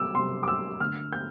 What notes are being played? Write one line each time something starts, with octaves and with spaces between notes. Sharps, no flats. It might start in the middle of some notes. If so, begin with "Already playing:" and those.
Already playing: C3 G3 D6 E6
C3 G3 C6
D6
E6
D3 A3 F6
G6